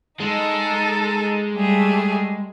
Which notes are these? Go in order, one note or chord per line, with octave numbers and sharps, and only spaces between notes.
G#3 D#4 A4
G3 A3 G#4